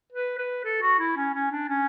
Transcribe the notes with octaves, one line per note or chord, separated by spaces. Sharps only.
B4
B4
A4
F#4
E4
C#4
C#4
D4
C#4